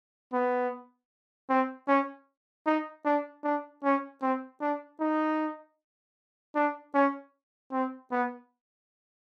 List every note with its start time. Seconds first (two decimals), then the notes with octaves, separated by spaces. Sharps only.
0.33 B3
1.50 C4
1.88 C#4
2.67 D#4
3.05 D4
3.44 D4
3.84 C#4
4.22 C4
4.61 D4
5.00 D#4
6.55 D4
6.94 C#4
7.72 C4
8.12 B3